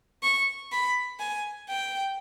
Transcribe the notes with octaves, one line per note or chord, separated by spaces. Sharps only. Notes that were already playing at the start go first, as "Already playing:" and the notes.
C#6
B5
G#5
G5